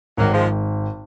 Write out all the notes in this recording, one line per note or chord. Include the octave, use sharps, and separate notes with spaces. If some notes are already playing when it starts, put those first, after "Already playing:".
G#1 G#2 D#3 F#3 A#3
F3 G#3